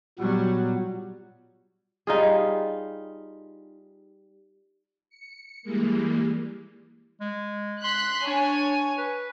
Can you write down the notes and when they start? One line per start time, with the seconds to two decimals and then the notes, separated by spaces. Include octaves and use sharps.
0.19 A#2 F#3 G3 B3
2.07 G3 D#4 F4 G#4
5.09 C#7
5.63 E3 G3 G#3 A#3
7.21 G#3
7.84 C6 F#6 B6
8.27 D4 C#5 G#5
8.98 B4